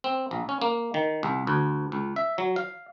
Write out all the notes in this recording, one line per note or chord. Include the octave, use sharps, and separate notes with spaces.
C4
A#1
C#4
A#3
D#3
C2
D2
C#2
E5
F#3
F5